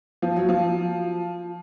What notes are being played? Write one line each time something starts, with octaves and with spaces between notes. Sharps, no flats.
F3
F#3
F3